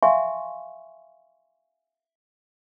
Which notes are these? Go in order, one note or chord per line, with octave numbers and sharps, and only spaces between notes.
E5 F5 G#5 A5 C6 C#6